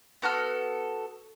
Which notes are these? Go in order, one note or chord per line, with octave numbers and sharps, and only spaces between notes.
B3 F#4 A4 F6